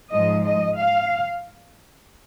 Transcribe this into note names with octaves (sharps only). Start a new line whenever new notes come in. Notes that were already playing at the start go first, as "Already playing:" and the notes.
G#2 F3 G#3 D#5
D#5
F5